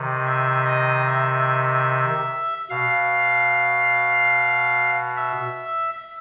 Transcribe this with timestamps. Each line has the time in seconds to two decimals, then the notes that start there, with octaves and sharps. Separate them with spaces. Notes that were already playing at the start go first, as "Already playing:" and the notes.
Already playing: C3 D#3
0.25 E5
0.66 D#5
1.06 E5
2.70 B2 F5
5.17 E5